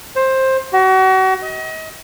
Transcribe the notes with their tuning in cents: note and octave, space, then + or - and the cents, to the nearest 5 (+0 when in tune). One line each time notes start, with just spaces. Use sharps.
C5 +15
F#4 +35
D#5 +35